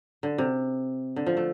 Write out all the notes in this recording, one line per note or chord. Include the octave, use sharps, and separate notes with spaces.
D3
C3
D3
F3
A3